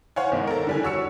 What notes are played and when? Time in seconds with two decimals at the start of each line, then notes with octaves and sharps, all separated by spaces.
0.16 C5 C#5 F5 F#5 G#5
0.32 G#2 B2 D#3
0.47 A4 A#4
0.67 D3 G3 G#5
0.83 F#4 C#5 E6 C#7